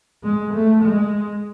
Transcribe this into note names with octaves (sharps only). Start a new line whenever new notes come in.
G#3
A3
G#3